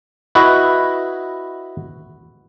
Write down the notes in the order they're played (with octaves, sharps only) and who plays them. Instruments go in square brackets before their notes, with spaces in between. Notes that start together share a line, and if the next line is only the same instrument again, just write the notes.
[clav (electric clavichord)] E4 F#4 B4 D#5